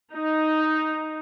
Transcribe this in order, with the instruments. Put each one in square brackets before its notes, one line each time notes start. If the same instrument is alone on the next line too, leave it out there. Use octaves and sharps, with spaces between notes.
[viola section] D#4